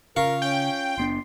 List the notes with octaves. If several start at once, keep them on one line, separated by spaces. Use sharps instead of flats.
C#3 F4 A#4 C#6
C#4 G5
F#1 B3 D4 C6